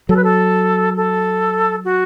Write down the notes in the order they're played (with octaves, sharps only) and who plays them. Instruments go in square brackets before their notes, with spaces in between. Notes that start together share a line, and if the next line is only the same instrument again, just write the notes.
[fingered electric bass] F#3 [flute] A4
[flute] B4
A4
A4
F#4